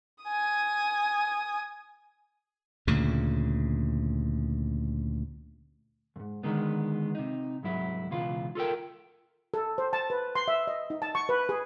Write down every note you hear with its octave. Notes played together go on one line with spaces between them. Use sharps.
G#5 D#6
D2 A#2 C#3
F2 G#2
D3 D#3 G#3 B3
C3 D#4
C2 G#2 F#3 E4
C#2 B2 E3 F4
F4 A4 A#4 G5
A4
C5
A5
B4
C6
E5
D#5
D#4
A5
C#6
B4
G#4